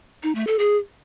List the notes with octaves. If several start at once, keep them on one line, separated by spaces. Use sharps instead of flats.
D#4
A3
A4
G#4